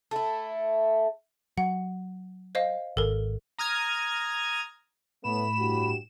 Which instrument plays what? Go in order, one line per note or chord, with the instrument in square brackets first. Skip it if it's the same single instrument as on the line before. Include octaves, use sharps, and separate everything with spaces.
[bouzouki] A3 E4
[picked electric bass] F#3 [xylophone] F#5
[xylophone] C5 D#5 F5
[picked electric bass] G#1 [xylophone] A4 A#4
[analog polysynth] A#5 D#6 F6 G#6
[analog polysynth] A2 E7 [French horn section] A3 B3 [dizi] B5
[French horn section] G2 F#4 G4